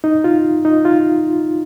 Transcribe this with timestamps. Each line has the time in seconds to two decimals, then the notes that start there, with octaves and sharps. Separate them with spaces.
0.04 D#4
0.24 F4
0.65 D#4
0.85 F4